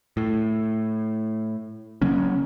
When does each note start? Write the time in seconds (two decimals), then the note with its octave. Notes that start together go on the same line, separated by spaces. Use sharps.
0.17 A2
2.02 C#3 F#3 A#3 C#4